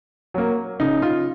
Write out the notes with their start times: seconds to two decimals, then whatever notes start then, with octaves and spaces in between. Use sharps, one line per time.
0.34 F#3 A#3
0.80 C#3 D#4
1.02 F4